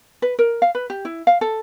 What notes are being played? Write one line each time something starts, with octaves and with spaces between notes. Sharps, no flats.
B4
A#4
F5
B4
G4
E4
F5
A4